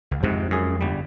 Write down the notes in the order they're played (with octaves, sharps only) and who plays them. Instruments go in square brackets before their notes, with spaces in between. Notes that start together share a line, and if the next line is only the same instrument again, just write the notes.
[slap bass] C#2
[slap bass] F2 G#3 [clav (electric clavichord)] G#2 C3
[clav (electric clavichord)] F#2 G#4
G1 G3